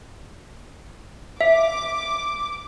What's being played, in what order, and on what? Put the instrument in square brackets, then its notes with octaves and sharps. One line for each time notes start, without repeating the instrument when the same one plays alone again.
[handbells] E5 [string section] D6